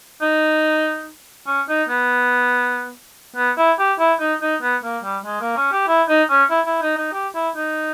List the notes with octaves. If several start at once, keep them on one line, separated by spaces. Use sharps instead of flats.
D#4
C#4
D#4
B3
B3
E4
G4
E4
D#4
D#4
B3
A#3
G3
G#3
A#3
C#4
G4
E4
D#4
C#4
E4
E4
D#4
D#4
G4
E4
D#4